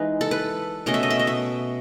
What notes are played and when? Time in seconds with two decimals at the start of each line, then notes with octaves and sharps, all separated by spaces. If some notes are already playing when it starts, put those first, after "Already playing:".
Already playing: E3 G#3 D#4 B4
0.21 A4
0.31 B4
0.86 B2 A3 C#4 D#5
0.94 E5
1.03 D#5
1.10 E5
1.19 D#5
1.27 E5